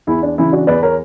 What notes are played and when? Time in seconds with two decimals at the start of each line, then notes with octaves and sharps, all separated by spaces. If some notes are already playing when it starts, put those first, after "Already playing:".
0.07 E2 E4
0.22 D4
0.38 C#3 E3 E4
0.52 D4 F#4
0.67 E2 B4 D5
0.83 A#4 C#5